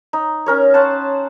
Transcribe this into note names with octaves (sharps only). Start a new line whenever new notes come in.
D#4
C#4 A#4 C#5
C#4 C5 F#5 A5